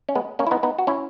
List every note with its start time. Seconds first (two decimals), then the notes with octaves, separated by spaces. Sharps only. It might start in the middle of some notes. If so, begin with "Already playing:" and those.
0.09 C#4
0.15 G#3 B3
0.39 A#3 C#4
0.47 E4
0.51 B3 D#4
0.63 B3 D#4
0.79 F#4
0.87 C#4 E4